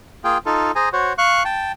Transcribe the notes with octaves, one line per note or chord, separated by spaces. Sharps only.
A#3 F4 G#4 G5
D#4 F4 A4
G#4 C5 G#5 A#5
F#4 C5 C#5
F5 C#6 F#6
G5 A5